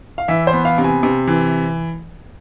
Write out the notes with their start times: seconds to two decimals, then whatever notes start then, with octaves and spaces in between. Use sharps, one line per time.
0.18 F5
0.28 E3 E5
0.47 C5
0.53 B3
0.65 F5
0.78 C3
0.84 G#5
1.03 C3
1.27 E3